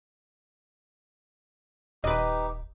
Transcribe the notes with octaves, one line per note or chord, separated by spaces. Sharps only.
D#1 D#4 G4 B4 D#5